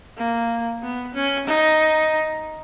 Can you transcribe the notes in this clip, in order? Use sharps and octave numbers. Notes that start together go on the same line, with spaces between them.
A#3
B3
C#4
D#4